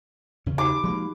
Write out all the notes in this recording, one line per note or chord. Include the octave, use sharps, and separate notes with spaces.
E2 C#3 C#4
D#4 F#4 G4 D6
F3 G#3 A#3 G#4 B5